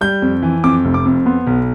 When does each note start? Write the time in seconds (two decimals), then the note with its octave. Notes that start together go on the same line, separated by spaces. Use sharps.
0.01 G3 G6
0.22 F2
0.42 E3
0.64 F2 D6
0.85 F1
0.94 D6
1.05 F2
1.26 B3 C6
1.47 B1